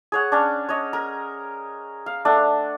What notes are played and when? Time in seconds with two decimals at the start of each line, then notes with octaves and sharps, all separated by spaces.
0.12 G#4 C#5 F#5
0.32 C#4 D4
0.69 C#5 D#5
0.93 A#4
2.06 F5
2.25 A3 D4 F#5